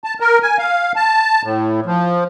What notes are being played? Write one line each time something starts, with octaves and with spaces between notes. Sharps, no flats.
A5
A#4
G#5
F5
A5
A2
F3